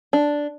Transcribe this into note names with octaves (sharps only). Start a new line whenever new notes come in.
D4